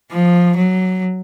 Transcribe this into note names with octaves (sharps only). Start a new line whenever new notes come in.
F3
F#3